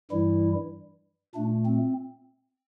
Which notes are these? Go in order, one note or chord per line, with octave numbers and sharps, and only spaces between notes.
G2 E3 G3 E4
A#2 A3 D4
C4